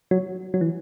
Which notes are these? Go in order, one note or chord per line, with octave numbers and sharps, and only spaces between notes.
F#3
F#3
E3